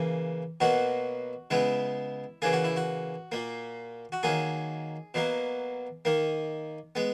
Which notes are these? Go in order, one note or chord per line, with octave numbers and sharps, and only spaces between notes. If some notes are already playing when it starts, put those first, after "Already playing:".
Already playing: C#3 E3 A#3
B2 F#3 A#3 F#4
C#3 G#3 B3 E4
C#3 E3 A#3 G#4
F#4
E4
F#4
A#2 A#3
F#4
D#3 F#3 A#3 G#4
B2 F#3 A#3
D#3 A#3
G#3 B3